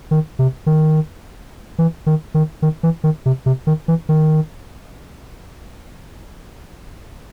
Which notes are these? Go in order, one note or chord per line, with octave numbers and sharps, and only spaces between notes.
D#3
C3
D#3
E3
D#3
D#3
D#3
E3
D#3
C3
C3
D#3
E3
D#3